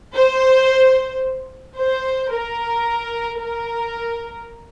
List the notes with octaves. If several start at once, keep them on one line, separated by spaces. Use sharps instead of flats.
C5
C5
A#4
A#4